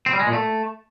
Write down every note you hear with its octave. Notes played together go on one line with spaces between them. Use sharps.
C4
G3
G#3
A#2
A3